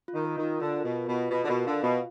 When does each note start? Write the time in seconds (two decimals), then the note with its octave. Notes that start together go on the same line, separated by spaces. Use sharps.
0.08 F4
0.14 D#3
0.25 A#4
0.38 D#3
0.43 F4
0.60 D3 F4
0.78 A#4
0.84 B2
0.96 F4
1.08 B2
1.14 F4
1.31 B2 F4
1.44 D3
1.48 B2 A#4
1.66 D3 F5
1.83 B2 F4